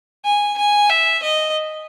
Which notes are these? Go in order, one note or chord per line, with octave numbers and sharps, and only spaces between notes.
G#5
G#5
E5
D#5